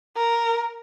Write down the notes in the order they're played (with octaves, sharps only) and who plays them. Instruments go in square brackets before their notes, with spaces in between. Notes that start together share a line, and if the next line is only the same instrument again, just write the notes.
[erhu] A#4